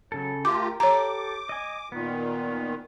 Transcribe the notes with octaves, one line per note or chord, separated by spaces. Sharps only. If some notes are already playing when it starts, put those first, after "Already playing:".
C#3 F#3 A4
A3 F4 G4 A#4 G5 D6
G4 A4 C#5 A#5 D6
D#5 G#5
A#2 D#3 B3